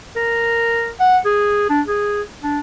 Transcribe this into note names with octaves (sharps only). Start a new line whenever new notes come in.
A#4
F#5
G#4
D4
G#4
D4